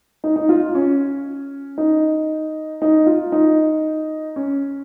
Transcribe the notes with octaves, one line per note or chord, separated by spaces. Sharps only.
D#4
D#4
F4
C#4
D#4
D#4
F4
D#4
C#4